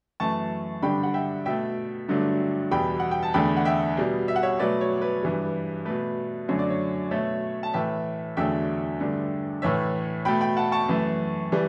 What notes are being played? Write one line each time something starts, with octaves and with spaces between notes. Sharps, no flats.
F#2 E3 A3 A5 C#6
G2 D3 G3 G5 B5
F#5
E5 G5
B2 A3 E5 G5
G2 D3 F#3 A3
E2 B2 G3 G5 B5
F#5
G5
A5
E2 D3 A3 G5 B5
F#5
E5 G5
B2 G3
E5
F#5
C#5 E5
B2 F#3 A3 B4 D5
C#5
B4
G2 E3 G3
B2 A3 B4
F#2 D3 F#3 A3 C#5
D5
C#5
B2 A3 C#5 E5
A5
A2 E3 A3 E5 G5
E2 D3 F#3 A3 E5 G5
G2 D3 A3
A2 E3 A3 C#5 E5
B2 A3 G5 B5
G5 B5
F#5 A5
A5 C#6
F#2 E3 A3
E3 G3